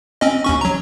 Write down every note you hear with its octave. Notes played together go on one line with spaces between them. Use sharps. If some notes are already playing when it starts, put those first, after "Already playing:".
C4 C#4 D#5
D#2 C#4 C#6
F#3 A#5